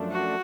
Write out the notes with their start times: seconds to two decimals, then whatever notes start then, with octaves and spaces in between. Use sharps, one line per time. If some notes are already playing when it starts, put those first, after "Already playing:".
Already playing: F#2 F3 A3 D4
0.12 F#4